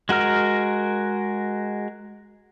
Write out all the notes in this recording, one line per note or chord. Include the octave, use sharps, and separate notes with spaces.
G#3 F#4 A#4 F6